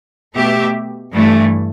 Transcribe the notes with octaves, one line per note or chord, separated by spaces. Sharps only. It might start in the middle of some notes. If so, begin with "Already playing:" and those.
B2 A3 G4 E5
G2 E3 A3